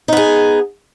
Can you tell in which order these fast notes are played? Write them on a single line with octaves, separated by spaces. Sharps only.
D#4 B3 G#4